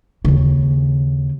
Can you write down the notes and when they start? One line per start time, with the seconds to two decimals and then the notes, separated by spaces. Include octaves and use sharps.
0.25 D#2 C#3